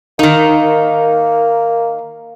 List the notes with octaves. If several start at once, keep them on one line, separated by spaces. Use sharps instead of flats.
D#3 A#3 D#4